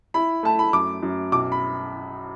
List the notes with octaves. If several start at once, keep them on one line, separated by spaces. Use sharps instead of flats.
E4 B5
A3 A5
B5
F#2 D6
F#2
B1 D6
B5